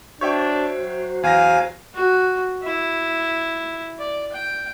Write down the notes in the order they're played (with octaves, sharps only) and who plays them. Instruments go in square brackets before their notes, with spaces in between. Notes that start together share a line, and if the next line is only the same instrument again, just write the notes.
[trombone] D4 [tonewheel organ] F#4 C5 [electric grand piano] C#5 E5 G5
[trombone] F#3
[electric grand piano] E2 A#6 [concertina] F5 G#5
[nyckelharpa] F#4
E4
D5
G5